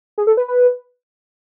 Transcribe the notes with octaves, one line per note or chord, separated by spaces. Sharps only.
G#4
A4
B4
B4